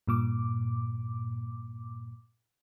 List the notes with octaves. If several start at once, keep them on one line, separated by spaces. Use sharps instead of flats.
G2 A#2 D6